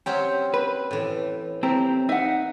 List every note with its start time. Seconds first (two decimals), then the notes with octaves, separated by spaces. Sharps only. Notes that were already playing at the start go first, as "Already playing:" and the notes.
0.06 F#3 C4 C#4 G4
0.54 B4
0.91 A2 E3
1.63 C4 E4 G4 A#5
2.09 D#4 E5 F#5